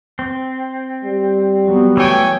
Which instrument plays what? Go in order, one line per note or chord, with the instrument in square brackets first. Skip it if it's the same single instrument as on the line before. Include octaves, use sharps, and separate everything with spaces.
[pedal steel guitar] C4
[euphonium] G3
[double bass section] F#3 B3
[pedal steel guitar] E3 A3 [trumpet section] C#5 G5 G#5